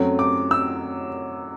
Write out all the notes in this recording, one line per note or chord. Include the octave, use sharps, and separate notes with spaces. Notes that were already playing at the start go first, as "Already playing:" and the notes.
Already playing: F#2 F#3 A3 C4
D6
E6